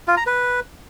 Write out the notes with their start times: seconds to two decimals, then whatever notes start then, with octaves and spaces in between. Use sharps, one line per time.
0.08 F4
0.17 A#5
0.27 B4